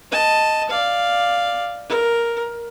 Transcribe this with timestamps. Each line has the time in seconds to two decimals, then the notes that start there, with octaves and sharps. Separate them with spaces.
0.11 D#5 A5
0.69 D5 F5
1.89 A#4